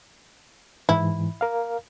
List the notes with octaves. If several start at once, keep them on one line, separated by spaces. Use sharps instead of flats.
G#2 E3 E4
A#4 F5